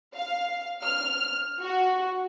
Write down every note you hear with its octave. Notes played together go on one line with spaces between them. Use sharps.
F5
F6
F#4